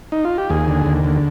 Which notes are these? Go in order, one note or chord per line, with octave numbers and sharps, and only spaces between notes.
D#4
F4
G4
D#2 G#4
D3
D#2
D3